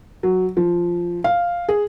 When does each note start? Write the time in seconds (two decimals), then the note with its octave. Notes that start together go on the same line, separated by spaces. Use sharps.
0.23 F#3
0.57 F3
1.24 F5
1.69 G#4